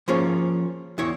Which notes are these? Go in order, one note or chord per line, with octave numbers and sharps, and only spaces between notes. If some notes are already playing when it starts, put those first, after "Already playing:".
F3 A#3 C#4 F4 G#4 C#5
E2 E4 C#5